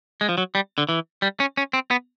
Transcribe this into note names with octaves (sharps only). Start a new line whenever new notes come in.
G#3
F3
F#3
G3
D3
E3
G3
C#4
C#4
C4
B3